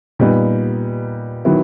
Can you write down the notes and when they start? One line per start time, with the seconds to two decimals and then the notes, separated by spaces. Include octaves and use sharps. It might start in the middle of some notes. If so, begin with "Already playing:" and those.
0.19 A#2 G3 B3 D#4
1.45 D#3 F#3 B3 E4